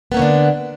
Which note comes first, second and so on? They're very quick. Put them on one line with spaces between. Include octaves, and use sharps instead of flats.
B3 A#3 C#4 D3 D4